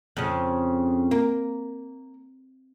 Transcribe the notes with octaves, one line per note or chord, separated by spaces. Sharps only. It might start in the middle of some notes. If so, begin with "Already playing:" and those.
F2 C#3
A#3